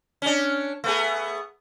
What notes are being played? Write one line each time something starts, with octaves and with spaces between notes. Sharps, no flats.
C#4 D4
A3 B3 G#4